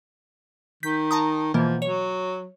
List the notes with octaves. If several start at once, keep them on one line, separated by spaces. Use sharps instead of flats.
D#3 G6 B6
A5 A#5 D#6
B2 E3 F3 A#3
F#3 C#5